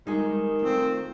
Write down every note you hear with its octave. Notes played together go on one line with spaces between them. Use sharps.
D#3 G3 G#3 D#4 G#4 A#4
A3 C4 F4